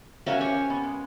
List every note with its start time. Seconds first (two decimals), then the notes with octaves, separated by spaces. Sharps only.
0.26 C#4 F#4 A#4 E5 F5 G#5
0.41 G4 C#5
0.70 B3
0.83 G#3